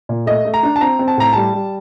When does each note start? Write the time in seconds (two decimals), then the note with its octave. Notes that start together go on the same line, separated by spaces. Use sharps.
0.09 A#2
0.26 A3 D#5
0.45 A3
0.54 A#5
0.63 D4
0.76 A5
0.81 C4 A#5
0.99 C4
1.08 A5
1.17 A2 A#5
1.33 G3 A5
1.54 G3